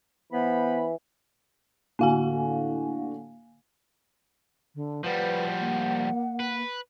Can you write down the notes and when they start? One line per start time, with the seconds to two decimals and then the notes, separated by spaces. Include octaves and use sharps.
0.32 E3 B3 C5 B5
1.99 A2 D3 A#3 F#4 F5 G#5
4.75 D3
5.04 F3 G3 B4 F#5
5.59 A#3
6.40 B4